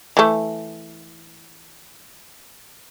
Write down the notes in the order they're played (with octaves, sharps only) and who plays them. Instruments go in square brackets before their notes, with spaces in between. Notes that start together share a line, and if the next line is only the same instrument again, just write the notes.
[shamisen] E3 A3